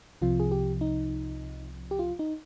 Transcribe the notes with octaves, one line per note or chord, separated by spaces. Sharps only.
C2 C3 F3 F4
G#4
G4
D#4
G4
F4
D#4